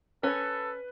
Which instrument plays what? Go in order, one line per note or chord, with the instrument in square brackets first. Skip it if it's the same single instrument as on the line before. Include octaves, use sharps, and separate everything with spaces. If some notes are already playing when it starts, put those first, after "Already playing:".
[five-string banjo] C#4 [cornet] A4 [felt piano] B4